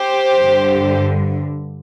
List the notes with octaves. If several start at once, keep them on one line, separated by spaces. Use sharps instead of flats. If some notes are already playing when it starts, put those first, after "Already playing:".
Already playing: G4 C5
G2 D3